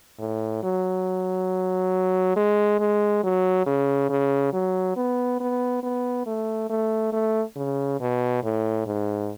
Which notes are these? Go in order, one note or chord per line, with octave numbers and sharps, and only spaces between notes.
A2
F#3
G#3
G#3
F#3
C#3
C#3
F#3
B3
B3
B3
A3
A3
A3
C#3
B2
A2
G#2